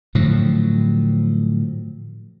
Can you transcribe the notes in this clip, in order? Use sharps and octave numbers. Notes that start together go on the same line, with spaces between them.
A2 D3 F3 F#3